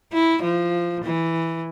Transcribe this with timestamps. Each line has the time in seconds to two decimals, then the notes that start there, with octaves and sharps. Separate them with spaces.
0.13 E4
0.43 F3
1.04 E3